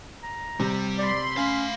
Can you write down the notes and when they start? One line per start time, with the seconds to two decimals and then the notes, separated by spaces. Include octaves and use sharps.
0.23 A#5
0.60 C3 G3
0.99 D5 B5 C6
1.37 A3 C#4 F5